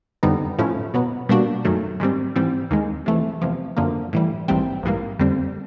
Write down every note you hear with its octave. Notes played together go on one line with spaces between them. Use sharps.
F2 D3 G3 B3 D#4
A2 F3 A3 C#4 E4
B2 F#3 B3
B2 G3 A#3 D4 F#4
F#2 D#3 F#3 A3
G#2 D#3 G3 C4
G#2 E3 G3 C4
D#2 D#3 G#3
C3 E3 A3
E2 C3 F3
F#2 D3 F3 A#3
A2 E3 G3
A#1 G#2 E3 G3 C4
A#1 G#2 E3 G3 A#3
F2 D3 G3 C4